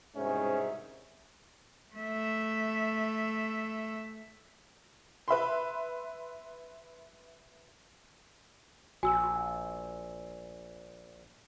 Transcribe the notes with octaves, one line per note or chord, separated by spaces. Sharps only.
C2 G#2 B2 D#3 C#4 G#4 C5 E5
A3 E5
B4 E5 B5 C6
A#1 F#4 G#5 E6